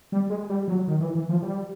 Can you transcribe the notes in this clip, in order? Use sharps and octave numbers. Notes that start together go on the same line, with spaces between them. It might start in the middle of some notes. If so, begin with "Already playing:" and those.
G3
G#3
G3
F#3
D#3
E3
E3
F3
G3